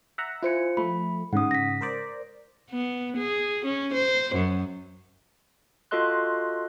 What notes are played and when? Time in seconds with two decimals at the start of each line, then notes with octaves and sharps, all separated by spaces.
0.18 E5 F#5 A#5
0.43 E4 F4 C5 G#5 C#7
0.77 F3 A3 B5
1.33 G#2 C#3 F#5 D#6
1.51 A#6 B6
1.81 A#4 C5 D5
2.70 B3
3.17 G#4
3.65 C#4
3.94 C5
4.35 F#2
5.91 F4 F#4 A4 D#5 C6 F#6